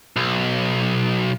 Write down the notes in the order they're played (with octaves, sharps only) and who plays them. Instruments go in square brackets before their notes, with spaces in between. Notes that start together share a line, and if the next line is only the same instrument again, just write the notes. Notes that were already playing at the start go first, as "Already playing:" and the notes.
[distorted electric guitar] B1